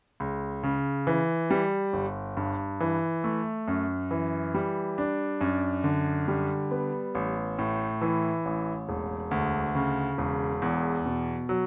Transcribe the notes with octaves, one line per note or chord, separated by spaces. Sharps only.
C#2
C#3
E3
G3
G1
G2
E3
A3
F#2
E3
G3
D4
F#2
D3
G3
B3
A1
A2
E3
A1
E1
D2
C#3
E1
E2
B2
F#3